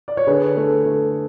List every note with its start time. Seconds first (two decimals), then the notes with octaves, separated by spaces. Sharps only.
0.08 D5
0.17 C#5
0.27 D3 G#4 B4
0.57 A3
0.85 A3